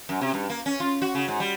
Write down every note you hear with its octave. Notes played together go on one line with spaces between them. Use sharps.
F#2
C3
G2
A#3
C#4
F4
F#4
C#3
G#2
G3